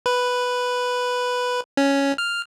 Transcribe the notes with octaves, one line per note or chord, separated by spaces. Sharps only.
B4
C#4
F6